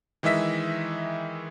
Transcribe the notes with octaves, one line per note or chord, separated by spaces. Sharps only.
D#3 E3 G#3 D#5 E5 B6